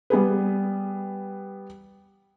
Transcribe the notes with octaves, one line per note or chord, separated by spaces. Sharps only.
G3 B3 G#4 B4